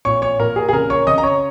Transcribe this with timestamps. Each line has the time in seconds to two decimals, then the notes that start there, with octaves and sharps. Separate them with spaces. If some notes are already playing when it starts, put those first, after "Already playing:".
0.05 A#2 C#5 C#6
0.22 C#5 C#6
0.39 A#2 A#4
0.56 G#4
0.69 G#4
0.73 C#3 A#4
0.90 C#5 C#6
1.07 C#3 D#5 D#6
1.18 A#5
1.23 C#5 C#6